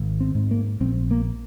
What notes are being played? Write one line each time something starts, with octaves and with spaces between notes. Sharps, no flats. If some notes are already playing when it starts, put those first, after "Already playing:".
Already playing: G#1
C4
G#2
A#3
A#1 C4
A#3